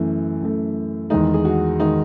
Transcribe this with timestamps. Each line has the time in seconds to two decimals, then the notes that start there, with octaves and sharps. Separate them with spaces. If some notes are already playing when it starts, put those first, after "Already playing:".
Already playing: F#2 E3 A3
0.41 F#2 E3 A3
1.10 E2 D#3 G#3 D#4
1.34 G#4
1.45 F#4
1.80 D#3 G#3 D#4